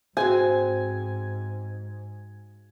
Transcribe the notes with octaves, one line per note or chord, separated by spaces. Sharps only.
G#2 G#3 B3 C4 F#4 G#4 G#5